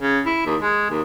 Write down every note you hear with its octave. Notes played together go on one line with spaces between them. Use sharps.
C#3
E4
D#2
G#3
D#2